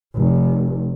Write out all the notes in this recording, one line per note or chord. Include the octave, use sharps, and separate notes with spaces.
F1